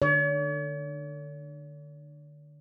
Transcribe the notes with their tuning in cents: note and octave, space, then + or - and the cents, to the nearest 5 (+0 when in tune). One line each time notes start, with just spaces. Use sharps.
D3 +25 C#5 +45